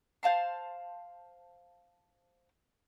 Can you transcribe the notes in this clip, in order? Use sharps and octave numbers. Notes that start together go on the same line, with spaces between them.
C5 F5 A5 C6